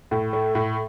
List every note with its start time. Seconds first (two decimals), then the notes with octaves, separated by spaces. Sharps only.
0.11 A2
0.33 A3
0.55 A2